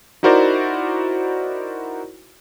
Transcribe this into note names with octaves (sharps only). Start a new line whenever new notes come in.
D#4 E4 F#4 A#4 C5 D5